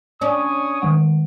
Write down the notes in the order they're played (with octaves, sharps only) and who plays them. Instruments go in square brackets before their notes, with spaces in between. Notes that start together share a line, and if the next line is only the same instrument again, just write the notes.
[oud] C#4 D4 [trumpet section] C#5 G#5 D#6
[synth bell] D#3 G#3 F#5